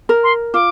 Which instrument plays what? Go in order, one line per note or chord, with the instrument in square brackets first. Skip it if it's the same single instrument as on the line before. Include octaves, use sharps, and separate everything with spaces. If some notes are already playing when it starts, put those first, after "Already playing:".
[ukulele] A#4
[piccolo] C6
[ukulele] F4 [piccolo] D6